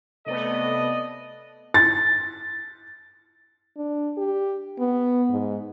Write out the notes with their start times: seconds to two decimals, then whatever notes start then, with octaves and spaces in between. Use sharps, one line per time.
0.26 C3 A3 B3 A4 D5 D#5
1.74 A6
3.77 D4
4.17 G4
4.79 B3
5.30 G#2